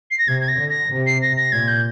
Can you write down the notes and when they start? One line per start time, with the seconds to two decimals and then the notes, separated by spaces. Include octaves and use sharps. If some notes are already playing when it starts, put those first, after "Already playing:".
0.11 C7
0.18 A#6
0.27 C3 G#6
0.41 G#6
0.48 A#6
0.59 D3
0.69 A#6
0.90 C3
1.06 C7
1.22 A#6
1.37 A#6
1.52 A#2 G#6
1.68 G6